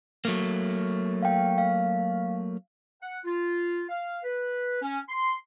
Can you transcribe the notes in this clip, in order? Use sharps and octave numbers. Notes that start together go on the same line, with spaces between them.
F#3 A3 A#3
F5 G5
F5
F#5
F4
F5
B4
C#4
C6